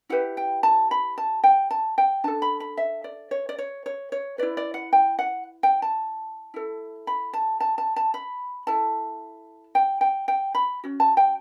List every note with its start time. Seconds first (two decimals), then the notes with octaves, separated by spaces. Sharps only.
0.09 E4 G4 B4 F#5
0.37 G5
0.63 A5
0.91 B5
1.18 A5
1.44 G5
1.71 A5
1.98 G5
2.24 D4 A4 A5
2.42 B5
2.60 B5
2.77 E5
3.04 D5
3.31 C#5
3.49 D5
3.58 C#5
3.86 C#5
4.12 C#5
4.38 E4 B4 D5
4.57 D5
4.74 F#5
4.93 G5
5.19 F#5
5.63 G5
5.82 A5
6.54 E4 A4
7.07 B5
7.33 A5
7.60 A5
7.78 A5
7.96 A5
8.14 B5
8.67 E4 A4 A5
9.75 G5
10.01 G5
10.28 G5
10.55 B5
10.84 C#4 F#4
11.00 A5
11.17 G5